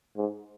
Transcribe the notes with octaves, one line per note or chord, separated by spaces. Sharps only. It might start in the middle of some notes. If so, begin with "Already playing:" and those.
G#2